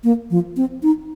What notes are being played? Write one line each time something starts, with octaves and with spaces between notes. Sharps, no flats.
A#3
F3
C4
D#4